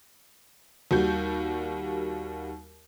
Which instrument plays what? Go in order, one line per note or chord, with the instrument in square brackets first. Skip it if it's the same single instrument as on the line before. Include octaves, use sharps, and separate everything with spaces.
[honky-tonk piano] D#2 G3 F#4 G6